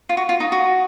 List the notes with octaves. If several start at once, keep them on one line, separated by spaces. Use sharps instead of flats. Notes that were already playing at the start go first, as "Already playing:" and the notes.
F4
F#4
F4
D#4
F#4